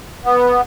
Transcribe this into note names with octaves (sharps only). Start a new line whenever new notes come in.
B3